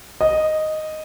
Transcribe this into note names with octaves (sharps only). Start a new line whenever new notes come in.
D#5